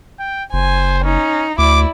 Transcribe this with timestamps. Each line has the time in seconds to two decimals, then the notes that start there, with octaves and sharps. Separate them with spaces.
0.19 G5
0.53 F#1 C5 G#5
1.03 C#4 D#4
1.58 D2 E4 D5 D6